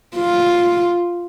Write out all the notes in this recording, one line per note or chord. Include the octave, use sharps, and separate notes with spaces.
F4